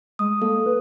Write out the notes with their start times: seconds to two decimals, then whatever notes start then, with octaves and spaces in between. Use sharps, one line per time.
0.19 G#3 D#6
0.42 A#3 A4
0.66 B4